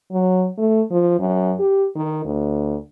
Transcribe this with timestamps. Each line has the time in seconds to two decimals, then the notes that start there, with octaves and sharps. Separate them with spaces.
0.12 F#3
0.58 A3
0.91 F3
1.19 F#2
1.60 G4
1.96 D#3
2.25 D2